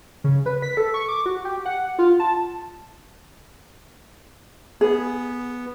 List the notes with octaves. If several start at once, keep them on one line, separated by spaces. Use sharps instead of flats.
C#3
B4
B6
A4
C#6
D6
F#4
G4
F#5
F4
A5
B3 G#4